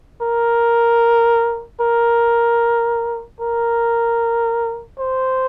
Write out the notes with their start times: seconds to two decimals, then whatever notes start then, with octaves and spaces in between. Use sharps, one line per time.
0.22 A#4
1.81 A#4
3.40 A#4
4.99 C5